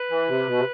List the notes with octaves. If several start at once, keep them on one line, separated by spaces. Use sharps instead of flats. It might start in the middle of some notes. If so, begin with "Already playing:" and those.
Already playing: B4
E3
C3
B2
C3